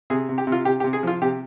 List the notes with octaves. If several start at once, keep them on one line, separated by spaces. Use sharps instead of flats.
C3 G#4
C3
G4
C3
F4
C3 G4
G4
C3
G#4
F3 F4
C3 G4